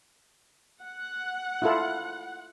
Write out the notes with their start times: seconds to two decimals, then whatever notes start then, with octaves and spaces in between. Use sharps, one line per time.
0.82 F#5
1.62 E4 F4 A4